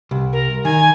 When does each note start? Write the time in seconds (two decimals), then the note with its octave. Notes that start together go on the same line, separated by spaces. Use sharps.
0.11 C2
0.33 A#4
0.65 D#3 G#5